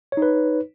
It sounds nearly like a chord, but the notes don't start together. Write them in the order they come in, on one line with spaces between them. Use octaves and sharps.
C#5 D#4 B4